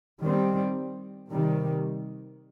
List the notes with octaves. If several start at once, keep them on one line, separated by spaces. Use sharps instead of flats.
D#3 G3 C4
C3 D#3 G3